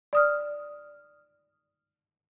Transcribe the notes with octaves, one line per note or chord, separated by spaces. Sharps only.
D5 D#6 F6